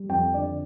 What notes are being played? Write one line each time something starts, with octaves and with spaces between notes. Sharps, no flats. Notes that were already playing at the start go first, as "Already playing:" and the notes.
Already playing: G3
F2 G5
D3 D5